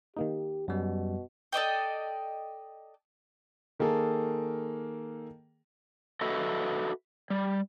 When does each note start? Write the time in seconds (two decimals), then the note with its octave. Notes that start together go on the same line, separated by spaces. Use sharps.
0.17 D#3 A#3 D#4 G4
0.68 F#2 B2 G3
1.53 A4 D5 D#5 G5
3.79 D#3 A#3 G#4 A4
6.21 F#4 A4 B4 D#5 E5
7.30 G3